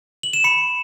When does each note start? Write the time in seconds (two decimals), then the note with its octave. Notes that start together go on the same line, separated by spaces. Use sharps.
0.23 F#7
0.33 E7
0.44 B5 C#7